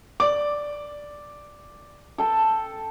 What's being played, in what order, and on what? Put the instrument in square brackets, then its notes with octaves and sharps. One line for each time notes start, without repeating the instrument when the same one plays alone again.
[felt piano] D5 D6
[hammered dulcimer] A4 G5 A5